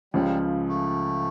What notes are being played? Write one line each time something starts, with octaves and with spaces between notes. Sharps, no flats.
C#2 C#3 F3 G3
A3